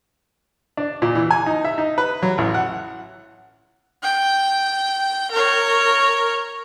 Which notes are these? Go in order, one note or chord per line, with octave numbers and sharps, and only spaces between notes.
D4
A#2
E3
G#5
D#4
E5
D#4
B4
F#3
A1
F#5
G5
A#4 C#5